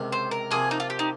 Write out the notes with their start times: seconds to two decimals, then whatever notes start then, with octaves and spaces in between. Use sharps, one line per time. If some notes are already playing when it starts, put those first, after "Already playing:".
Already playing: C#2 C3 D#3
0.12 C5
0.31 A#4
0.51 C3 F3 A#3 G#4
0.71 D#4
0.80 F4
0.90 G4
0.99 D#4